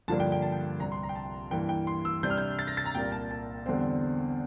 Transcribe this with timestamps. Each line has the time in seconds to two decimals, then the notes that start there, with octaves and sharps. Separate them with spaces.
0.08 G2 D3 F3 A#3 D4 A5
0.20 G5
0.32 G5
0.42 A5
0.52 G5
0.80 C2 C3 G3 A#5
0.92 C6
1.03 A#5
1.09 G5
1.15 A5
1.51 G2 E3 A#3 G5
1.69 G5
1.87 C6
2.05 E6
2.23 C3 G3 D4 G6
2.30 F6
2.38 G6
2.59 A6
2.67 A#6
2.77 A6
2.86 A#5
2.95 C2 A#2 G3 A#3 G5
3.12 A5
3.31 A5
3.66 E2 D3 G3 C4